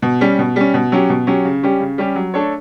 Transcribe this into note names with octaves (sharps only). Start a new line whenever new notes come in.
B2
G3 C#4
B2
G3 C#4
B2
F#3 C#4 G4
B2
F#3 C#4 G4
C#3
G3 C#4 G4
C#3
G3 C#4 G4
F#3
A3 D4 A4 C#5